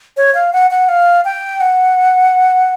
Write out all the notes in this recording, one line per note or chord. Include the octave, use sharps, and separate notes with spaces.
C#5
F5
F#5
F#5
F5
G5
F#5